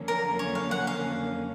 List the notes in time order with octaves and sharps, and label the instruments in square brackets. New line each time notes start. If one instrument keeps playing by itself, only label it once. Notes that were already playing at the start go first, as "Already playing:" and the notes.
Already playing: [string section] F2 D3 F#3 A#3 C#4
[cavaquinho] A#4
C#5
F5
F#5
F5